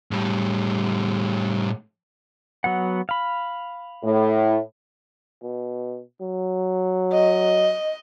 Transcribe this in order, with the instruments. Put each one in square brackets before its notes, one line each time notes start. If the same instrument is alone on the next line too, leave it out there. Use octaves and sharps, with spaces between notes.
[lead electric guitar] A2 G3
[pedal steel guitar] F#3 B3 F#5
F5 B5
[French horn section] A2
[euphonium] B2
F#3
[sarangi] D#5